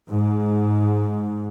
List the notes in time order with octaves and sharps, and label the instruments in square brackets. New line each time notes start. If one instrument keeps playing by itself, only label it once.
[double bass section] G#2